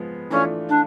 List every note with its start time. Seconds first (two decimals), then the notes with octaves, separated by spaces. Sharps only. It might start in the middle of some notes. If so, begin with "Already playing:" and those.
Already playing: F3 G#3 B3
0.30 E3 A3 C#4 D4 F4
0.69 D4